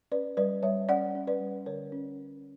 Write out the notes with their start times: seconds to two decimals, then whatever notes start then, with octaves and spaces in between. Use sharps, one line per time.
0.12 C#4 B4 D5
0.37 G3 B4 D5
0.63 G3 C#5 E5
0.89 C#4 D5 F#5
1.15 C#4
1.27 B4 D5
1.40 G3
1.66 D3 A#4 C#5
1.92 C#4